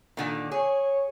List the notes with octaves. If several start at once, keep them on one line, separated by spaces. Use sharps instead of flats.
A#2 D3 D#3
G#4 C#5